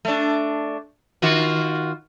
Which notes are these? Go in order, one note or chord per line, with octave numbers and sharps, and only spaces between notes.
A3 D4
D#3 F4 F#4